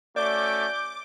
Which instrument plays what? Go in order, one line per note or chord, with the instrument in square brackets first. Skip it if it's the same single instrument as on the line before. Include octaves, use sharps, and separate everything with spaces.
[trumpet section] A3 C#4 F#4 [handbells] D5 [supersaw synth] D6 [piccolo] G6